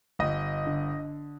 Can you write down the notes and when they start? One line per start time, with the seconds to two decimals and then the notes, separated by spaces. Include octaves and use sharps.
0.19 G1 D#5
0.66 D3